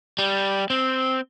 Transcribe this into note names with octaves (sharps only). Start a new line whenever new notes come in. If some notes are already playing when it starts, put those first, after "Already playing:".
G3
C4